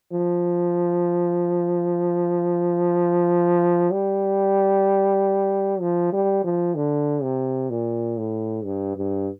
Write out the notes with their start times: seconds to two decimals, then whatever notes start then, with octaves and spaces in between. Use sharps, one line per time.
0.13 F3
3.91 G3
5.81 F3
6.13 G3
6.44 F3
6.75 D3
7.23 C3
7.70 A#2
8.18 A2
8.65 G2
8.96 G2